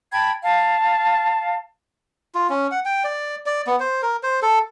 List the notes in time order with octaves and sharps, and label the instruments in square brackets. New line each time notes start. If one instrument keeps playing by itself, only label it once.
[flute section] G5 A5 B5 G#6
F5 A5
[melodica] F4
C#4
F#5
G5
D5
D5
B3
C5
A#4
C5
A4